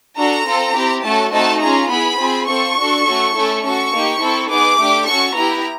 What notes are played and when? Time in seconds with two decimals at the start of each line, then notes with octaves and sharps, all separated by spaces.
0.18 D4 F#4 A4 A#5
0.46 C4 F4 A4
0.75 C4 E4 G4
1.04 A3 C#4 F#4 A4 A5
1.32 A3 C4 D#4 F#4 A4 A5
1.61 C#4 F4 G#4 A#5
1.90 B3 E4 G#4 B5
2.19 C4 F4 G#4
2.47 C4 F4 A4 C#6
2.77 D4 F#4 A4
3.05 A3 C#4 F#4 A4
3.35 A3 C#4 E4 A4
3.63 C#4 F#4 A4 C#6
3.92 A#3 D#4 G4
4.21 C4 E4 A4
4.50 B3 D#4 G#4 D6
4.79 A3 D4 G4
5.08 C#4 F#4 A4 C#6
5.37 B3 E4 G4 A#5